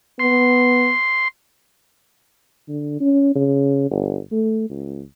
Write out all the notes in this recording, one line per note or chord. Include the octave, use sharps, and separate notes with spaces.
B3 C6
D3
C#4
C#3
G1
A3
C#2